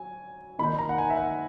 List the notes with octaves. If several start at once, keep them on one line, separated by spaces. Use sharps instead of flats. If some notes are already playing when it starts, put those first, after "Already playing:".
Already playing: F#3 G#5
D#3 A#3 D#4 B5
A#5
F#5
G#5
E5
F#5